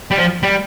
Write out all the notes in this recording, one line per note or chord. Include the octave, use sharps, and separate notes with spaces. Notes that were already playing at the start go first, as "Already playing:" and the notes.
G3
F3
G3